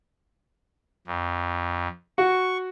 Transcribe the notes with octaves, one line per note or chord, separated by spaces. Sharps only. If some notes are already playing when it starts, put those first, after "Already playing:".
F2
F#4 C#6